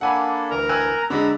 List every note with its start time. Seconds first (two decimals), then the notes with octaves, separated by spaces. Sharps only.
0.01 A#3 D4 A4 F#5 G#5 B5
0.50 D2 E3 A#4 A#5
0.69 G#5 E6 F#6
1.10 D3 G#3 D5 A#5 B5 E6